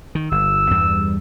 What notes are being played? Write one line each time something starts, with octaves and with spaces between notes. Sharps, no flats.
D#3
G1 E6
E2 G2 G3